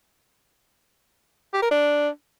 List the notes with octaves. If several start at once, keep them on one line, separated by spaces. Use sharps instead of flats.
G4
A#4
D4